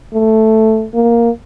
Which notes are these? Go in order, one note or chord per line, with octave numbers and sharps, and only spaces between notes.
A3
A#3